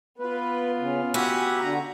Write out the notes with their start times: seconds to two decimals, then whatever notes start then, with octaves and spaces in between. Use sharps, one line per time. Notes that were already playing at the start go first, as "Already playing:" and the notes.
0.19 B3 F4 B4
0.78 C#3
1.14 F#4 G4 B4 E5 G#5
1.59 D3 A#5